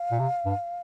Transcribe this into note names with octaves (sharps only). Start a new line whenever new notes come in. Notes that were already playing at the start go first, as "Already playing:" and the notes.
Already playing: F5
A#2
C3
G2